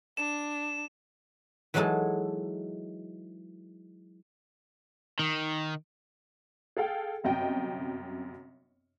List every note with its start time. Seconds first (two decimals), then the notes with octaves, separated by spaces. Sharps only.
0.17 D4 E7
1.74 E3 F#3 G#3 D#4 A4
5.19 D#3
6.77 G#4 A4 F5 G5
7.24 G1 F#2 C3 D#5 G5